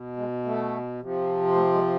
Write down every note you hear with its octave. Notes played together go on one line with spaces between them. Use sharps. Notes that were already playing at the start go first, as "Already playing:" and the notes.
Already playing: B2
G#3
A3
C3 F3
A3
G#3